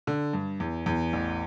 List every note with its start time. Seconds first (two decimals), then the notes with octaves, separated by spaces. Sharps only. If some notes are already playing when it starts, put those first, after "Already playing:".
0.07 D3
0.33 G2
0.60 E2
0.86 E2
1.13 A1